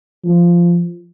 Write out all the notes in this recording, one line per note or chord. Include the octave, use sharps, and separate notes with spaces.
F3